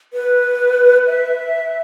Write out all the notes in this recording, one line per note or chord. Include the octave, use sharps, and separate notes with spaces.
B4
E5